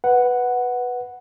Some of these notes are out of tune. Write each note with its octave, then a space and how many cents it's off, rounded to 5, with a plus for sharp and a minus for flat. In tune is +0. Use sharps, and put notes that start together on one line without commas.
B4 +0 F#5 +0